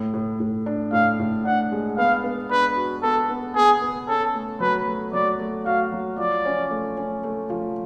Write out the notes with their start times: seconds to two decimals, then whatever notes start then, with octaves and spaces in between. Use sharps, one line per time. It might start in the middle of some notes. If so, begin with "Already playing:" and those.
Already playing: A2
0.14 A2
0.40 A2
0.66 D4
0.92 A2 F5
1.19 A2
1.45 D4 F#5
1.72 G#3
1.97 B3 F5
2.24 B3
2.50 D4 B4
2.76 F#4
3.03 B3 A4
3.29 B3
3.55 B3 G#4
3.81 B3
4.08 C#4 A4
4.34 A3
4.60 F#3 B4
4.87 A3
5.13 F#3 D5
5.40 A3
5.66 F#4 F5
5.92 F#3
6.18 F3 D5
6.45 C#4
6.71 A3
6.97 C#4
7.24 A3
7.50 F3